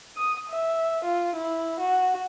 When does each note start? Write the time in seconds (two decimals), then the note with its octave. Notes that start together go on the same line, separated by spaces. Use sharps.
0.17 D#6
0.49 E5
1.04 F4
1.36 E4
1.80 F#4